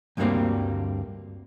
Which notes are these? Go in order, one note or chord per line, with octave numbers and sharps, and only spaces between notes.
D2 G2 D3 G3 A#3 C4